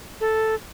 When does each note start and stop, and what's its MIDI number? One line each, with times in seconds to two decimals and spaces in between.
0.21 0.55 69